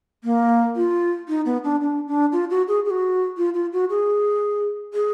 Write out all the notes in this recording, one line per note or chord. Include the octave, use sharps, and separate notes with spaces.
A#3
F4
D#4
B3
D4
D4
D4
F4
F#4
G#4
G#4
F#4
F4
F4
F#4
G#4
G#4